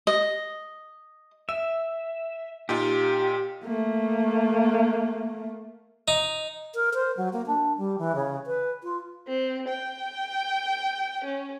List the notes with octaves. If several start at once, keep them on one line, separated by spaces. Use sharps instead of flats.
D#5
E5 E6
A#2 D#4 F4 G4
A3 A#3
D#4
A#4
C5
F#3
A#3
D4
G3
E3
C#3
B4
F4
C4
G5
C#4